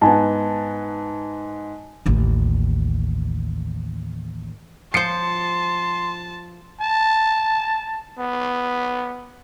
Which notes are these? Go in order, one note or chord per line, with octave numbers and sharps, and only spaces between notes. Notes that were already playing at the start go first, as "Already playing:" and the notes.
G#2 B3 G#5 A5
A1 D#2
F3 C5 A5 C6 C7 C#7
A5
B3